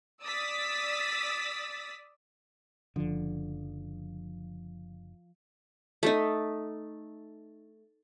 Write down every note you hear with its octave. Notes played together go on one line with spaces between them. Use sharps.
D5 D#6 E6 A6 B6
F#1 D3 F3
A3 D#4